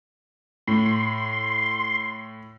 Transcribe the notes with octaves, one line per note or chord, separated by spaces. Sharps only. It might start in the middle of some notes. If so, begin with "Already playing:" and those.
A2 C6